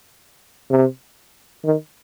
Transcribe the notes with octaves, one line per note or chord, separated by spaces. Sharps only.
C3
D#3